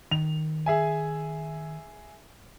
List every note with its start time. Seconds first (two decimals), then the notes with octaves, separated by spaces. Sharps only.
0.11 D#3 F7
0.66 G#4 E5 G#5